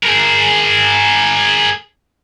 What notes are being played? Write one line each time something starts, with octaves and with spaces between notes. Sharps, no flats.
G#4 A#4